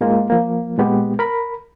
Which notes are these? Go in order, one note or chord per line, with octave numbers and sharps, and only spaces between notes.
G#2 G#3 A#3 F4
F3 A#3
A#2 G#3 B3 G4
A#4 B5